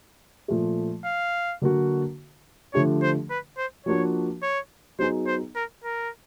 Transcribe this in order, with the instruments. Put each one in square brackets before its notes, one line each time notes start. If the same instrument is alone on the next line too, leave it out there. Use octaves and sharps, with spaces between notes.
[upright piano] A#2 F3 A3
[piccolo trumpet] F5
[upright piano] D3 F#3 A#3 D4 F#4
[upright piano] D3 F3 A3 D4 G4 [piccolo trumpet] C#5
[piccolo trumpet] C5
B4
C5
[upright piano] F3 A#3 D4 F#4 [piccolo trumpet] C#5
[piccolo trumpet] C#5
[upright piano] F#3 B3 D#4 G#4 [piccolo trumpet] C5
[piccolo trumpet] C5
A#4
A#4